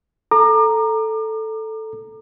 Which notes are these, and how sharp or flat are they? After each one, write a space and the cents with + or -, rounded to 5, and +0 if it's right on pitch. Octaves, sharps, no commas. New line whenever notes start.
A4 +0 A#5 +0 D6 +35